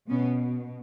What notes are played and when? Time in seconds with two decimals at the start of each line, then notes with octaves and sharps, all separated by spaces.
0.10 B2 B3 C#4